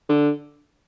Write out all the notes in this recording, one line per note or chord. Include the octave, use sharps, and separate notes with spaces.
D3